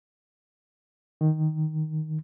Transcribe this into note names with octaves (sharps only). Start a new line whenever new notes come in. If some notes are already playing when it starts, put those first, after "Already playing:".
D#3